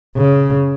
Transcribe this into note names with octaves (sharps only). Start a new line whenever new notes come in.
C#3